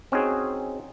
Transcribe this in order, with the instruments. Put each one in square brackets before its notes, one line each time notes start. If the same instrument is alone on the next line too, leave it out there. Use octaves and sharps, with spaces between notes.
[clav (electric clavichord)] C4 C#4 D#4 F#4 G#4